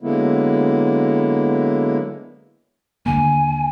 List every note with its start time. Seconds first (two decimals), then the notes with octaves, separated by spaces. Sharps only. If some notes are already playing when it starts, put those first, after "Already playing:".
0.01 D3 F#3 G#3 A#3 B3 E4
3.06 D#2 D3 A#3 G#5